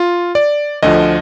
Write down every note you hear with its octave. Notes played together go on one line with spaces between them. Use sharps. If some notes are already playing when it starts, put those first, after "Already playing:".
Already playing: F4
D5
D2 D3 F3 D#5